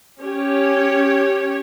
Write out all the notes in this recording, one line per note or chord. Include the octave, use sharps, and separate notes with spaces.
C#4 G4 C#5